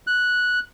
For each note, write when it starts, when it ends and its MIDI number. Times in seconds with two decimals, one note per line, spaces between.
0.07 0.60 90